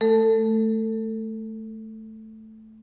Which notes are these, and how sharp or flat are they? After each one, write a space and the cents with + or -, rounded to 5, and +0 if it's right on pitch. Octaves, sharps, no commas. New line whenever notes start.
A3 -5 A4 +25